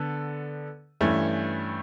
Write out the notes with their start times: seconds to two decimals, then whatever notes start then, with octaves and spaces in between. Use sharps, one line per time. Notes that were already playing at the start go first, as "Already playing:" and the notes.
Already playing: D3 B3 A4
1.01 G2 E3 A3 C#4